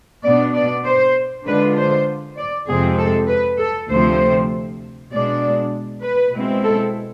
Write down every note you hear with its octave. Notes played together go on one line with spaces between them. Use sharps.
B2 B3 D4 D5
D5
C5
D3 G#3 D4 F4 B4
C5
D5
F2 C3 G#3 C4 G#4
A4
B4
A4
D2 C3 F3 A3 C4 C5
B2 G#3 D4 D5
B4
B2 G#3 C4 E4
A4